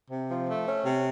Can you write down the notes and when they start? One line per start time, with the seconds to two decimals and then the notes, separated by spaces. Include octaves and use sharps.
0.11 C3
0.30 F3
0.49 A3
0.67 C#4
0.86 C3